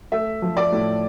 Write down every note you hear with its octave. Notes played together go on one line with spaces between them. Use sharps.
A3 E5
F3
D5
A2